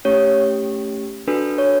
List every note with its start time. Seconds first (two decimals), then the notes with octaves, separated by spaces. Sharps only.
0.05 A3 C#4 G4 C#5
1.28 D4 F#4 A4 B4
1.58 C#5